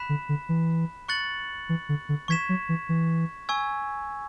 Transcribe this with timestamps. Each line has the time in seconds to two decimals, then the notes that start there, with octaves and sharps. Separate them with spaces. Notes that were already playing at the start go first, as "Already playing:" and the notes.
Already playing: B5 F#6 B6 E7
0.09 D3
0.29 D3
0.49 E3
1.09 C#6 F#6 A6 C#7 F#7
1.69 E3
1.89 D3
2.09 D3
2.28 E3 C#6 G#6 B6 E7
2.49 F#3
2.69 E3
2.89 E3
3.49 G#5 C#6 E6 G#6